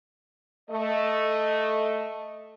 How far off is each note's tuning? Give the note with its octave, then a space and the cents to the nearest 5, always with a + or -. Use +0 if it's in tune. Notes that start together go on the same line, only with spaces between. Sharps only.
A3 +0 D#5 +0